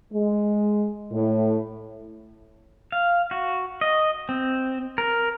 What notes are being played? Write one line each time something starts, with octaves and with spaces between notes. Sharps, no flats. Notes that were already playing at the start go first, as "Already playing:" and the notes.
G#3
A2
F5
F#4
D#5
C4
A#4